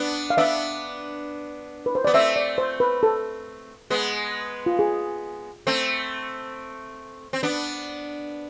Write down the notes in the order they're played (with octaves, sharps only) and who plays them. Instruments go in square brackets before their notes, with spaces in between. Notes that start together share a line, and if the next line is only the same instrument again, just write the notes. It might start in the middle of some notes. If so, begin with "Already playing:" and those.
Already playing: [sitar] B3 D4
[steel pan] F5
[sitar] B3 D4 [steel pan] E5
[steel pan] B4
C5
[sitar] B3 [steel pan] D5
[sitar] A3 C4 [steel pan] E5
[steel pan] D5
C5
B4
A4
[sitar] G#3 B3
[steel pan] F4
G#4
[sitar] A3 C4
C4
B3 D4